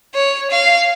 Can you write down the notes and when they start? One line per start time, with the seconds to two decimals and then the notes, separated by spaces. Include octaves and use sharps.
0.15 C#5
0.51 F5